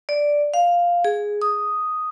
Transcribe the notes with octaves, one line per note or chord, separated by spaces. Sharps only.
D5
F5
G#4
D#6